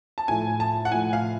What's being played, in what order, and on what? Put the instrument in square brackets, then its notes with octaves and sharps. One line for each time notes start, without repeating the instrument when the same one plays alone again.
[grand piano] A5
[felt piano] A2 F3 A3 [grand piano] G#5
[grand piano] A5
F#5
[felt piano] A2 F3 A3 [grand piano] G#5
[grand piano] F5